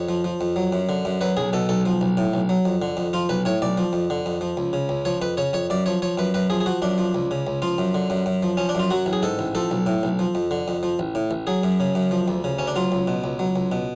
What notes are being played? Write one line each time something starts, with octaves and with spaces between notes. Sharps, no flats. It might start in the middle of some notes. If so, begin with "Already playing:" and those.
Already playing: F2 C#5
F3
F3
F2
F#3
F#2
D3
F#2
F#3 B4
B1 G#4
B2 A4
B1 A4
F3
B1
A2
B1
F#3
F2
D3
F2
F3 F4
B1 B4
A2 C#5
B1 D5
F3
F2
D3
F2
F3
C#2
C#3
C#2
F3 C#5
F2 B4
C#3 C#5
F2 C#5
F#2 D5
F3 C#5
F3 C#5
F#2 B4
F#2 B4
F3 G#4
G#4
F3 F#4
F#2 D4
F3
C#2
C#3
C#2
F3 F4
F#2
D3
F#2
F#2
F3
F3 C#4
D4
F#2 F4
F#3 F#4
A1
G#4
G#2 A4
A1
F3 A4
B1
A2
B1
F3
F2
D3
F2
F3
A1
A2
A1
F#3 G#4
F#2
C#3
F#2
F3
D2
C#3
D2 C#4
D4
F#3 F4
C#2
B2
C#2
F#3
C#2
B2